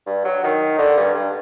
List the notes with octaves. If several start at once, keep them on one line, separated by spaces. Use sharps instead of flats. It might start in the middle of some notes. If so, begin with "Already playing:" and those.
G2
F#3
D#3
D3
G2
G2